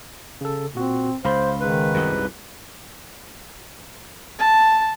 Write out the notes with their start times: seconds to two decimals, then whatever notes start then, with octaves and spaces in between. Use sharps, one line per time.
0.41 C#3 A4
0.75 A#2 C4 F#4
1.25 C#2 C5 F5 B5 C6
1.60 G#2 D#3 B4
1.94 C2 F#2
4.39 A5